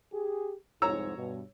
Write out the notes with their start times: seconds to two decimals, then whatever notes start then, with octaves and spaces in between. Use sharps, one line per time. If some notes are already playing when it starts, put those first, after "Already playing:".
0.13 G4 G#4
0.82 C2 F2 G#2 C#5 A#5 E6
1.16 G2 B2